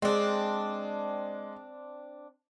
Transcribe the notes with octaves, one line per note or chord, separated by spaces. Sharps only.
G#3 C4 D4